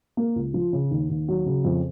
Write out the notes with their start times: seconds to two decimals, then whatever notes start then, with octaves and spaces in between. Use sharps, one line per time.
0.17 A#3
0.36 C#2
0.54 F3
0.73 C#3
0.91 D#2
1.10 D#2
1.28 F#3
1.46 C#3
1.65 F2